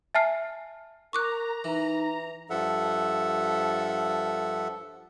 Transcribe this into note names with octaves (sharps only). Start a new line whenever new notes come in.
E5 G#5 A5 F6 C7
A#4 A#5 C#6 D6 F#6
E3 D#4
G2 F3 A4 E5 F#5